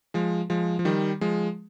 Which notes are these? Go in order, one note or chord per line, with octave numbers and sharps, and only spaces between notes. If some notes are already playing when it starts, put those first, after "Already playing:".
F3 G#3
F3 G#3
F3
D#3 G3
F3 G#3